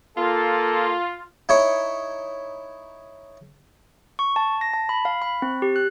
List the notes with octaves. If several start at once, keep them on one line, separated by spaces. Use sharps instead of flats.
A#3 F4 A4
D#4 E4 C#5
C#6
A5
A#6
A5
B5
F5
B5
C4
G4
F#6